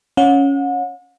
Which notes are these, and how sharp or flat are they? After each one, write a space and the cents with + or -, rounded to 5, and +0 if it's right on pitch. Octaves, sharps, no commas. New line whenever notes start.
C#4 +0 F#5 -40